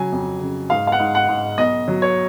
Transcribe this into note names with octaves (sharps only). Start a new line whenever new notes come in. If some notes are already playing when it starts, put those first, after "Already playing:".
Already playing: C#3 F#3 G#5
F2
C#3
G#2 F5
F5
F#5
G#2
F#5
G#2
B1 D#5
F#3
C#5